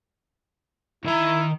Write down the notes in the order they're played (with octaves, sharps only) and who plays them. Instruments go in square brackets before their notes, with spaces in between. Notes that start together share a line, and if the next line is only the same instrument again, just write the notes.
[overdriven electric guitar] D#3 A#5 [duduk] E4